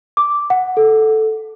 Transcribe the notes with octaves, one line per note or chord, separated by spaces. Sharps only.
D6
F#5
A4